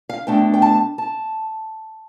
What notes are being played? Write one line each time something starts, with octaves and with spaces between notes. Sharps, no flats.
F5
B2 A3 D4 G5
G5
A5
A5